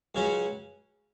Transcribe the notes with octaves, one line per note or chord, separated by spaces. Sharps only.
C#2 C#3 F#3 C#4 C#5